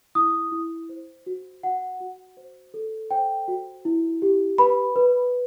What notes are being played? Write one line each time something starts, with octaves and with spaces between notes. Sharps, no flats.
E4 D#6
E4
C5
F#4
F#4 F#5
F#4
C5
A4
C5 G5
F#4
E4
G4
B4 B5
B4